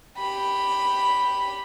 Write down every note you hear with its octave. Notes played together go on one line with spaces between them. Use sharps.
G4 B5